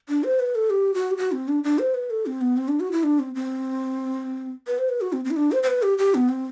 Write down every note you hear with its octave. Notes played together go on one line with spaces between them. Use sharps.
D4
C5
B4
A4
G4
F#4
G4
F#4
C4
D4
D4
C5
B4
A4
C4
B3
C4
D4
F#4
E4
D4
C4
C4
B4
C5
B4
F#4
C4
C4
E4
D4
C5
C5
B4
G4
G4
B3
C4